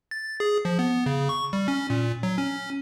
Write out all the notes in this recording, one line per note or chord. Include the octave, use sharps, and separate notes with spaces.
A6
G#4
F3
B3
C#3
C#6
G3
C#4
A#2
F#3
C#4